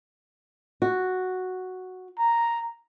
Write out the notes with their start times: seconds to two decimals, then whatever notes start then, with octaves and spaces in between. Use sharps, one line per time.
0.82 F#4
2.19 A#5